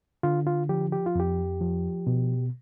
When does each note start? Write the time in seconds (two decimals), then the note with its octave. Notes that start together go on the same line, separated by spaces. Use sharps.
0.23 D3 F4
0.47 F4
0.69 F3 G4
0.92 G4
1.06 F4
1.15 F2 G4
1.61 F3
2.07 B2